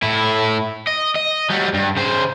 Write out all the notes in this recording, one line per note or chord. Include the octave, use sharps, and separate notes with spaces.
A2 E4
D#5
D#5
F#3 G3
G2
C#3 C5